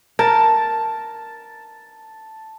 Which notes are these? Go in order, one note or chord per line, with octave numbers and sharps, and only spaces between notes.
A#4 A5